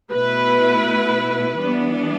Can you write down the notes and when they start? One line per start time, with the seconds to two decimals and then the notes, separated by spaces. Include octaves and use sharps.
0.11 B2 A3 E4 B4
1.58 E3 G3 B3 D4